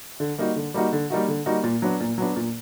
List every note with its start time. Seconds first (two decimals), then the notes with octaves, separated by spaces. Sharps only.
0.20 D3
0.38 G3 A#3 D#4 F#4
0.56 D3
0.74 G3 A#3 D#4 F#4
0.92 D3
1.10 G3 A#3 D#4 F#4
1.28 D3
1.46 G3 A#3 D#4 F#4
1.64 A#2
1.82 F#3 B3 D4
2.00 A#2
2.18 F#3 B3 D4
2.36 A#2